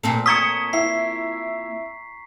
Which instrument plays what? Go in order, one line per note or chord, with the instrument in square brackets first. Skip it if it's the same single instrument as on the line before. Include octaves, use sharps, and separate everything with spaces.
[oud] A#2 C4 A4
[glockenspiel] A#5 C#6 B6 [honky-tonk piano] D#6 G#6 C#7
[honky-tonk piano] E4 [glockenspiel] C7